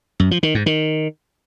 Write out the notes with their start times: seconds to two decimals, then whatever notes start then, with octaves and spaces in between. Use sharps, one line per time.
0.20 F#2
0.31 F3
0.43 D#3
0.55 G#2
0.66 D#3